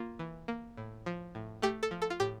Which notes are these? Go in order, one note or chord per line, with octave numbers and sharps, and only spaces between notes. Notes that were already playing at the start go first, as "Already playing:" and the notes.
Already playing: A#3 F4
E3
A#3
A2
F3
A2
A3 G4
A4
F3
A4
F4
A2 G4